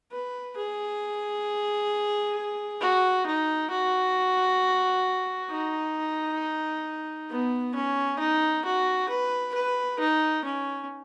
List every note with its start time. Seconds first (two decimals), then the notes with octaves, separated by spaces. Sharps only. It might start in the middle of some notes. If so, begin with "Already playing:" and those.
0.12 B4
0.57 G#4
2.81 F#4
3.26 D#4
3.71 F#4
5.50 D#4
7.30 B3
7.75 C#4
8.19 D#4
8.65 F#4
9.09 B4
9.55 B4
10.00 D#4
10.45 C#4